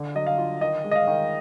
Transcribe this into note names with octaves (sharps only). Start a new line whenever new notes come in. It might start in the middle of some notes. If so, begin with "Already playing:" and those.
Already playing: D3
F#3 D#5
F5
F4
D#3 D#5
G#3
D#5
F5
D#3